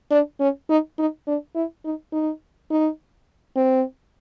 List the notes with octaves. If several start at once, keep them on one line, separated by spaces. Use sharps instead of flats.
D4
C#4
D#4
D#4
D4
E4
D#4
D#4
D#4
C4